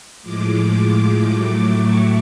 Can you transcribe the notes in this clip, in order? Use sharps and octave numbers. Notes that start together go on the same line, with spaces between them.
A2 F3 G#3 D6
D6
A2 F#3 A3
C#6